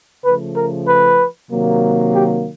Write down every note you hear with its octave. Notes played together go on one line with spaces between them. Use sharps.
C#3 F3 A3 B4
A#4
B4
C3 D#3 F#3 A#3
G4